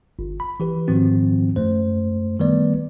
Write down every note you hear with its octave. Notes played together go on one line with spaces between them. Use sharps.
G1
B5
E3 G4 B4
G#2 D#3 F3 C4 F#4
F#2 A3 C5
D#3 G3 A3 B3 B4 D5